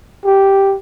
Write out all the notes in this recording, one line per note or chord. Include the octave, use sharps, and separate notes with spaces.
G4